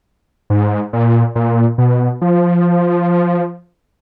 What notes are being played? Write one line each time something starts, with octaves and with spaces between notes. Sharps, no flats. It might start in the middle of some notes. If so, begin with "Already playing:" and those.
G#2
A#2
A#2
B2
F3